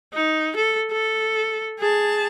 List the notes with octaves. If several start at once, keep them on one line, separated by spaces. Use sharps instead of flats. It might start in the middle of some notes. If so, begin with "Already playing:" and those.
D#4
A4
A4
G#4 A5